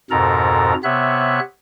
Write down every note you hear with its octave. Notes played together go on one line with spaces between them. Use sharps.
F2 G#2 B2 A4 A#4 A#5
C3 B3 C#5 E5 F#6